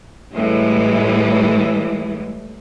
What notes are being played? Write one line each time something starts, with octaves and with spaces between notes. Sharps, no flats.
A2 E3 G3 G#3